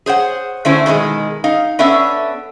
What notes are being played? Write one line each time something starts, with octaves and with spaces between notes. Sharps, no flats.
G#4 C5 C#5 F#5
D3 A3 C#4 E4 C5
B2 D#3 F#3 G#3
D#4 F5
B3 C#4 D4 A4 E5